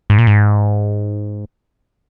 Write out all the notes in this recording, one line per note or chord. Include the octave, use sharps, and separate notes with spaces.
G#2
A#2
G#2